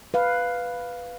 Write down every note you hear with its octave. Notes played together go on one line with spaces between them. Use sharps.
B4 F5